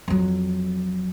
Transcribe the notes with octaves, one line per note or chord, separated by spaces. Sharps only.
F2 F#3